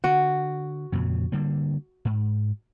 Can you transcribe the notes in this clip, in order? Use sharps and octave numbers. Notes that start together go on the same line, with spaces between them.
D3 F#4
F2 A#2 C#3
D3 G3 A#3
G#2